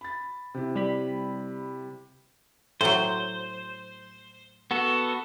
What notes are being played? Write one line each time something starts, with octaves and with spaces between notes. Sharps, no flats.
B5 A6
C3 E4
G3 B5
A2 F#3 C5
B3 F#4 A4